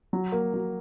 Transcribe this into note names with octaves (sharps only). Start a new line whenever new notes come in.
F#3
A#3
F#3